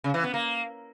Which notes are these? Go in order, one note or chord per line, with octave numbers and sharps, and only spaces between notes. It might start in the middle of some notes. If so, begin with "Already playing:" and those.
C#3
E3
B3
A#3